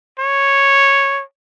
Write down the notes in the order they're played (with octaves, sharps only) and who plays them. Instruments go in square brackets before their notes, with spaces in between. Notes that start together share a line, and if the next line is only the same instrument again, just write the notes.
[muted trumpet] C#5